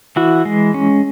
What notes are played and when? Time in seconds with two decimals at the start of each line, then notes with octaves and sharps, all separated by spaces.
0.16 E3 E4 F#4
0.45 G#3
0.74 C#4